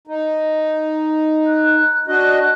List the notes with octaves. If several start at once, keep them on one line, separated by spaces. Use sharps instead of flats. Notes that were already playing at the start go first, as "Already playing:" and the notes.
D#4
F#6
D4 F#4 D#5 F#6